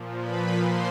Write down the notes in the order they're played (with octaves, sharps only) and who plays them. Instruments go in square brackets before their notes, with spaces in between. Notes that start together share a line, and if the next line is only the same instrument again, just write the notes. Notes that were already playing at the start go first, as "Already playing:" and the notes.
Already playing: [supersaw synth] A#2 F3
B4 B5
C5 C6